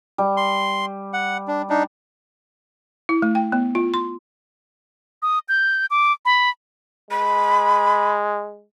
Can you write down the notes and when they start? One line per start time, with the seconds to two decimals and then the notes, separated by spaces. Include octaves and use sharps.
0.18 G3
0.37 C6
1.13 F#5
1.48 D4
1.70 D4 D#4
3.09 E4
3.22 A3
3.35 G5
3.52 B3
3.75 F4
3.94 C6
5.22 D#6
5.49 G6
5.91 D6
6.25 B5
7.11 G#3 B5